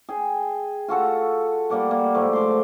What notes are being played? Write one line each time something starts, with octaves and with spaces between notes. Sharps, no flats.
G#4 G5
F4 F#4 A4 F#5
G3 A#3 D5 F#5
A#3
G#2 F3 A3
C6 D6